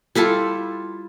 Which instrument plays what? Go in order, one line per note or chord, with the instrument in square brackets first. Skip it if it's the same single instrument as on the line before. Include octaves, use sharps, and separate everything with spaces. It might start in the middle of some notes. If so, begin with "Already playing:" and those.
[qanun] G3 E4 F4 A4